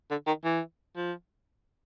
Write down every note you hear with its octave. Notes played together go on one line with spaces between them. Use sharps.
D3
D#3
E3
F3